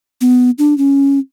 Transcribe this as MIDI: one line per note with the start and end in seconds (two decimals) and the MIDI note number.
0.21 0.50 59
0.58 0.77 62
0.78 1.19 61